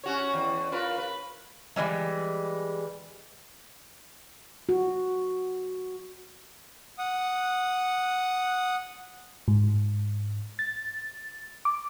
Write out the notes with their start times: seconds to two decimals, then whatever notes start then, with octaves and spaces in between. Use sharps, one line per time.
0.04 C#4 F#4 C#5
0.34 E2
0.72 F4 A#4 B4
0.98 B4
1.76 E3 F3 G3 G#3
4.69 F#4
6.98 F#5 D#6
9.48 G#2
10.59 A6
11.65 D6